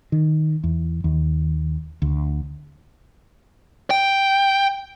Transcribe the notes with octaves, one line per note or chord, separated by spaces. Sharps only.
D#3
E2
D#2
D2
G5